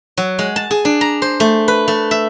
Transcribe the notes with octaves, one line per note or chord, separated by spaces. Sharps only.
F#3
G#3
A5
G#4
D4
A#5
C5
A3
B4
A3
E5